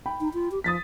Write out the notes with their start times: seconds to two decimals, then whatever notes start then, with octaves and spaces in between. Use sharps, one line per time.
0.06 G5 B5
0.20 D#4
0.34 F4
0.51 G4
0.64 F3 D#6 A6 B6